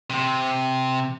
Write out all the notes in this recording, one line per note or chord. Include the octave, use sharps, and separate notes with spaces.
C3